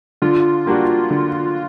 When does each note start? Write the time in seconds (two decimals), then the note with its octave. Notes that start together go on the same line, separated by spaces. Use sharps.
0.22 D3 F4
0.66 G3 A#3 D4 F#4
1.11 D3